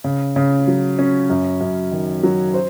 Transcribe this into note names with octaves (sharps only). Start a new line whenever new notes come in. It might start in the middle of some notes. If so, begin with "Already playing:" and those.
C#3
C#3
F#3
C#4
F#2
F#2
D#3
F#3
C5